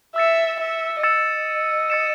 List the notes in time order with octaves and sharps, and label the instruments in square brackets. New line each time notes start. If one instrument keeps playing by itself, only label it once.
[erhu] E5 [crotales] E6 A6 C#7 E7
[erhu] E5
[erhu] D#5 [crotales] E6 A6 C#7 E7
[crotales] E6 A6 C#7 E7